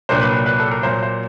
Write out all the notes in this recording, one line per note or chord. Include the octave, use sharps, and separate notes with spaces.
C2 A#2 F#3 A#3 D4 C5
B4
B4
A4
A#4
A#2 F#3 A#3 C5
C5